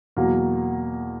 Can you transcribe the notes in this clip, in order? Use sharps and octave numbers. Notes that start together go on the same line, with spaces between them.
E2 B2 F#3 A#3